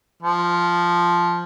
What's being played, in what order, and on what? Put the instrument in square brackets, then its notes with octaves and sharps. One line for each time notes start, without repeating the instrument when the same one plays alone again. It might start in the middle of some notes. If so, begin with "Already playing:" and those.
[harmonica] F3